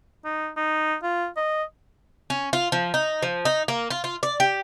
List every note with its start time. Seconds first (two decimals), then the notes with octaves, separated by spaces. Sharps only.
0.25 D#4
0.57 D#4
1.03 F4
1.37 D#5
2.30 C#4
2.53 F4
2.72 F3
2.94 D#4
3.22 F3
3.45 D#4
3.68 A#3
3.90 F4
4.04 F4
4.23 D5
4.40 G4